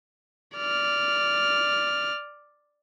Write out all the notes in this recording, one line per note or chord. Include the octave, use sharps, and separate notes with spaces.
D5 F6